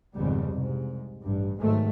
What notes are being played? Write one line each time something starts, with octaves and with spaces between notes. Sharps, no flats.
G#1 F2 G#2 C#3 G3 B3
C2 G#2
A1 G2
G#2 D#3 F#3 A3